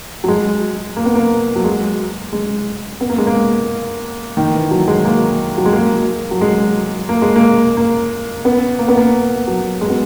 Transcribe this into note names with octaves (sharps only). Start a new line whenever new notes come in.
F#3
G#3
A#3
B3
A#3
F#3
G#3
G#3
B3
A#3
G#3
A#3
D#3
E3
F#3
G#3
A#3
F#3
G#3
A#3
F#3
G#3
A#3
G#3
A#3
A#3
B3
A#3
B3
A#3
F#3
G#3
B3